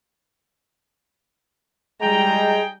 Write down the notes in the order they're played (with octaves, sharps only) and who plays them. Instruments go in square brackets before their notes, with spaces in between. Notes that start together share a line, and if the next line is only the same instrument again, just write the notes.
[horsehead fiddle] G3 A#5 [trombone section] G#3 [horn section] D#4 G#4 G5